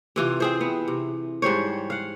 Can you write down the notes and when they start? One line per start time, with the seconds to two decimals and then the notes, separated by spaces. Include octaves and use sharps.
0.16 C3 E3 F4
0.40 C4 G#4 C5
0.61 B3
0.88 C3
1.42 G#2 G3 C5 C#5
1.90 F5 F#5